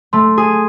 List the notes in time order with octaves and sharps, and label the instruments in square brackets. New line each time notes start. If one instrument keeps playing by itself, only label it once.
[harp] A3 [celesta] C6
[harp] G#4